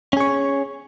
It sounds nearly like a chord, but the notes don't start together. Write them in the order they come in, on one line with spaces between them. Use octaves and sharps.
C#4 G#4 C#5